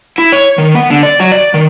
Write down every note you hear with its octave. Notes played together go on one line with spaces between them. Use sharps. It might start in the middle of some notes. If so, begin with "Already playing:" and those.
E4
C#5
D#3
B3
D3
D5
F#3
D5
D#3